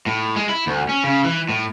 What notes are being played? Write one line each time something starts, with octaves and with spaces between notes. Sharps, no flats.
A2
G#3
E4
D2
C#4
C#3
E3
A2